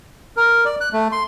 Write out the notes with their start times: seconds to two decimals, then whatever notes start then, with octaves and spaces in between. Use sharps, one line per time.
0.37 A#4
0.65 D5
0.81 F#6
0.93 A3
1.12 C6